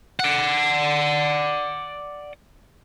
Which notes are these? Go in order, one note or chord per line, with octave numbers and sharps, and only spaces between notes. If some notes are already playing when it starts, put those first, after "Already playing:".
D5 F#5